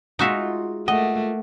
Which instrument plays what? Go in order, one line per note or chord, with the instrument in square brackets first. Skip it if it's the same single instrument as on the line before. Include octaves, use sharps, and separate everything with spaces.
[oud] G#3 F4 [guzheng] D#4 F#4 E5
[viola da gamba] A3 A#3 [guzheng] D#5 [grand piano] F#5